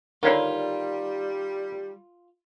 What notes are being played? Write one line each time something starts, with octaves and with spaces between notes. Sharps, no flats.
D3 D#3 G3 A#3 F4 C#5 B5